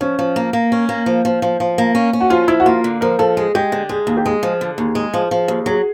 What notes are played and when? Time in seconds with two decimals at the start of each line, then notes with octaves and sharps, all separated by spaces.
0.01 F3 C#4
0.19 F3
0.36 A#3
0.53 A#3
0.72 C#4
0.89 A#3
1.06 F3
1.25 F3
1.42 F3
1.60 F3
1.78 A#3
1.95 C#4
2.13 C#4
2.21 F#4
2.30 F3 F4
2.48 F3 E4
2.60 F#4
2.66 A#3 F4
2.84 D3
3.01 F3 A#4
3.19 F3 A4
3.37 G#3 G#4
3.55 G#3 G4
3.72 D3
3.89 G#3 G#4
4.07 D#2
4.17 G4
4.26 G#3 G#4
4.43 F3
4.61 D3
4.78 D#2
4.95 G#3
5.14 F3
5.31 F3
5.48 D#2
5.66 F#3 G#4